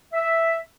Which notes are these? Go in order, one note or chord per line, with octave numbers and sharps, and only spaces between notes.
E5